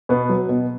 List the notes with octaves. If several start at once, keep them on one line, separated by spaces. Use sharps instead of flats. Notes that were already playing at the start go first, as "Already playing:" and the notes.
B2 B3
F#3
B2